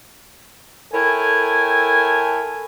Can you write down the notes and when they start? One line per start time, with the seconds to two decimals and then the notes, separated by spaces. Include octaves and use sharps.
0.93 E4 A4 A#4 C#5 G5 G#5